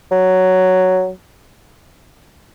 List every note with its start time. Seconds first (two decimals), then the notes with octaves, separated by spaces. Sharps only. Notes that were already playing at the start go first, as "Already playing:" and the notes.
0.12 F#3